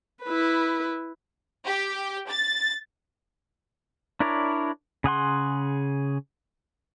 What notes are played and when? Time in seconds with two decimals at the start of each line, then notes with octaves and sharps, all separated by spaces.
0.24 E4 B4
1.65 G4
2.30 A6
4.20 D4 E4 A#4 C#5 D5
5.04 C#3 G#4 F#5 C6